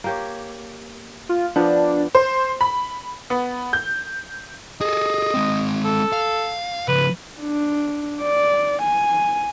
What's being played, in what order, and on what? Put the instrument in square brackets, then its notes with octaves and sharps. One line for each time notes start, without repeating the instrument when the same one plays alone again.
[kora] A#3 G4 C#5
[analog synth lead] F4
[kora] F3 B3 [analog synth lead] D4
[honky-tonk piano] C5
B5
B3
G6
[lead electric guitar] G#4 A4 [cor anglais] D#5
[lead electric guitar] G#3 C4
[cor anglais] A4
[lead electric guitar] F5
[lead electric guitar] C#3 F3 [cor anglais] B4
[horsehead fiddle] D4
D5
G#5